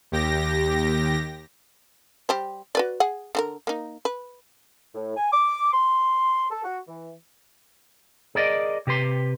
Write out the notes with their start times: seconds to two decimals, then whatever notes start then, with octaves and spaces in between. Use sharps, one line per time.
0.12 D#2 G4 A#6
2.29 G3 G4 C5
2.75 F#4 B4 D5
3.00 G#4 F#5
3.35 D3 F#4 A#4
3.67 A#3 D#4
4.05 B4
4.94 A2
5.17 G#5
5.32 D6
5.73 C6
6.50 A4
6.64 F#4
6.87 E3
8.35 G#4 A#4 D5 D#5
8.87 C3 G4 B4 C6